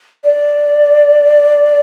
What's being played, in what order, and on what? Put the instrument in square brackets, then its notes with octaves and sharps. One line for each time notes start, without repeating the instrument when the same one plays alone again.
[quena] D5